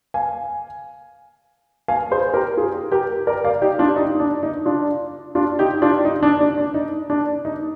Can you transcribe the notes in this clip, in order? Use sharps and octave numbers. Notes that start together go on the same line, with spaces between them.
F5 G#5
F5 G#5
G#4 C5
G4 A#4
F4 G#4
G4 A#4
A#4 D5
D5 F5
D#4 G4
D4 F4
D#4
D4
D#4
D4 F4
D4 F4
D#4 G4
D4 F4
D#4
D4
D4
D4
D#4
D4
D#4